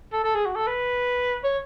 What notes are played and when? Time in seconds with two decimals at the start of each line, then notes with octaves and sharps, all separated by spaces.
0.13 A4
0.24 A4
0.35 G#4
0.45 F#4
0.55 A4
0.67 B4
1.44 C#5